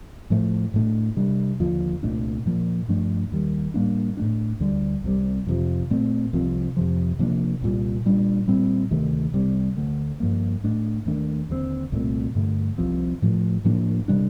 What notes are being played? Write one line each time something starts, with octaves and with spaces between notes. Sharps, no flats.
A2 F3 A3
A2 A3 D4
C3 G3 D4
D#2 D3 F3
C2 A#2 A3 D4
A#2 F3 A#3
G2 F3 A3 D4
D#2 D#3 G3
A2 G3 A#3 D4
A2 A3 D4
D2 D3 G3
C2 C3 G3
F2 C3 F3
A#2 A3 C4
C2 C3 F3 C4
F2 C3 F3
C3 F3 A#3 D4
C2 A#2 G3
A#2 G3 A#3 D4
A#2 G3 C4
D2 C3 D#3 A3
C2 C3 G3
D2 D3 A3
G2 F3 A#3
A2 A3 D4
D#2 D#3 A3 D4
D#2 D3 F3 C4
C2 A#2 A3 C4
G2 D3 A3
C2 C3 F3 C4
A2 F3 A3
A2 F3 A#3 D4
C3 G3 D4